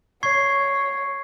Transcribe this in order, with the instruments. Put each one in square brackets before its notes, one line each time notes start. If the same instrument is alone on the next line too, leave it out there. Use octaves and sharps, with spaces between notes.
[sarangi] C#5 [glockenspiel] C#6 G#6 C7